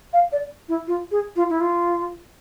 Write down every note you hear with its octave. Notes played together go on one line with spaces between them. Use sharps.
F5
D5
E4
F4
G#4
F4
E4
F4